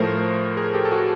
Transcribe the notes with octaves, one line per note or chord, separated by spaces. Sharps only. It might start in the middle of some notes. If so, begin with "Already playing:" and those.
Already playing: A2 F3 A3 A#4 C5
G#4 A#4
G4 A4
A4
F#4 G#4